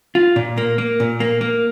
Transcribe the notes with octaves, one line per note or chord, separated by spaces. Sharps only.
F4
A#2
A#3
A#3
A#2
A#3
A#3